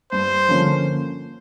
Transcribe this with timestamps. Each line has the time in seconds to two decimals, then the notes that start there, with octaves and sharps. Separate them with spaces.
0.12 G2 C5
0.48 D3 F3 A#3 C#4